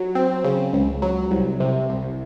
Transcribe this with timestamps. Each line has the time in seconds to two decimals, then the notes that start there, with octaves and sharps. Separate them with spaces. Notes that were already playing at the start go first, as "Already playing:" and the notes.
Already playing: F#3
0.15 C4
0.44 C#3
0.73 C#2
1.02 F#3
1.31 C2
1.60 C3
1.89 C2